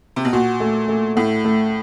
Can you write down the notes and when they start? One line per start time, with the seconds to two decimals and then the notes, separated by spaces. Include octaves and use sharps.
0.16 C3
0.25 B2
0.33 A#2 F#4
0.60 A3
0.88 A3
1.16 A2 A3
1.45 A3